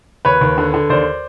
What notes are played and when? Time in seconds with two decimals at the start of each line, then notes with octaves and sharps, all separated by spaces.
0.25 D#2 B4 C#5
0.41 D#2
0.58 D3
0.74 D3
0.90 D#2 C5 D5